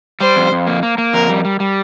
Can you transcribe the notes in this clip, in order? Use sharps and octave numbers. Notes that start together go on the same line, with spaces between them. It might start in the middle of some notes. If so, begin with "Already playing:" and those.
G3 C5
F2
F2
A#3
A#3
A#3
F2 A#4
G3
G3
G3